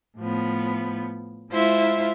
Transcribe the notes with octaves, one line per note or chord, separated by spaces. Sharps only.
A2 F3 B3
G#3 E4 F4 C5 E5